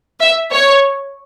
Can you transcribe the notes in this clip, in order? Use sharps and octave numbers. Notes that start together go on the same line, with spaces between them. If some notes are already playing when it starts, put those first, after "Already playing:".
E5
C#5